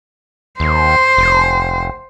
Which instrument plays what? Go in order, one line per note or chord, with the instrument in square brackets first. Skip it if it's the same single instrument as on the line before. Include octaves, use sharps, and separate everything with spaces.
[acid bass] D#2 [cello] C5
[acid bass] F1